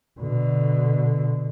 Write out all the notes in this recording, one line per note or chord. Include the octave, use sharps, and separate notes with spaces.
B2 D3